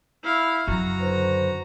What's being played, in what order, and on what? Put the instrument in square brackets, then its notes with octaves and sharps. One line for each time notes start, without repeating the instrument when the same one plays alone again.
[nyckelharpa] E4 F5
[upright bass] F#2 C#3 [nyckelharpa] F#4 A#5
[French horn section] D3 B4 C5